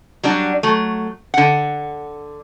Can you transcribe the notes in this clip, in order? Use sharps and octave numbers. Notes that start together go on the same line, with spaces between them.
F#3 G3 D4 F#4
F#3 A3
D3 F#5